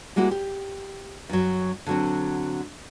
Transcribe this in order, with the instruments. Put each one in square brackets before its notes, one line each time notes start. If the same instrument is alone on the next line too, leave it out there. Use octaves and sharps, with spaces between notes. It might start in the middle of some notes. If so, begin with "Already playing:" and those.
[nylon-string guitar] G3 G#3 A#3 E4 F#4
G4
F#2 F#3
D3 F#3 C4